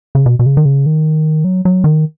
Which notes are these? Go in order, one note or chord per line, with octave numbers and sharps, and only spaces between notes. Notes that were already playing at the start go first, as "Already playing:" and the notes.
C#3
B2
B2
C#3
D#3
C#3
D#3
F#3
F#3
D#3